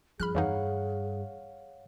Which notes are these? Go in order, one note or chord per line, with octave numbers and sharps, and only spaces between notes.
G2 F3 G#4 B5 F6 F#6
F2 E3 D#4 C#5 F5 F#5